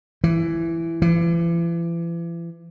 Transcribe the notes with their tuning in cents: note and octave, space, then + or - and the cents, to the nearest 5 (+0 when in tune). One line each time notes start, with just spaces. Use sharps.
E3 +10
E3 +40